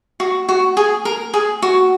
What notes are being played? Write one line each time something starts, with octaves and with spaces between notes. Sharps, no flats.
F#4
F#4
G#4
A#4
G#4
F#4